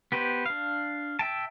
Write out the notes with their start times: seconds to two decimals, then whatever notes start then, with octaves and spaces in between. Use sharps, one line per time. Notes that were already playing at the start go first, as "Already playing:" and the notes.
0.12 B3 G4 B4 C5
0.46 D4 F5
1.19 E5 G5 A5